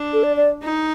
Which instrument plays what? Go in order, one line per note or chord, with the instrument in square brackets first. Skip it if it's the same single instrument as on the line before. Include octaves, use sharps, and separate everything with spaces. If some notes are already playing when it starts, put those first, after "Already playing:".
Already playing: [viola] D4
[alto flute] A4
D5
D5
[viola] D#4